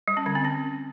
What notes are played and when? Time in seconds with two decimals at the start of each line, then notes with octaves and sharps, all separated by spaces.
0.08 G3
0.17 C#4
0.26 D3
0.35 C4
0.45 C#4